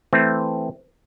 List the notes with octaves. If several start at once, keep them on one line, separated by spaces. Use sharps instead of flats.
E3 A3 C4